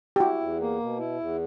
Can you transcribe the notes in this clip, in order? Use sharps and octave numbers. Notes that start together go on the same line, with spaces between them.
G4
E4 F#4
E2
A#3
B2
E4
E2